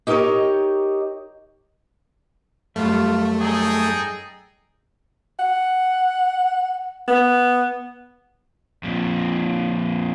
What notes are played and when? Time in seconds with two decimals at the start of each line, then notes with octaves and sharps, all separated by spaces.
0.07 D#4 G4 A#4 B4 C#5 D#5
2.76 F#2 G3 A3 F4
3.40 D#4 G#4 A4 G5
5.39 F#5
7.08 B3
8.83 F2 A#2